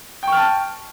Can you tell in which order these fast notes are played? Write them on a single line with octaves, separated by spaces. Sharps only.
G5 C#6 F6 A5